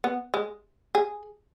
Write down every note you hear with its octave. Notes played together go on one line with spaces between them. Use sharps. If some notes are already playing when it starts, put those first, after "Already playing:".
B3
G#3
G#4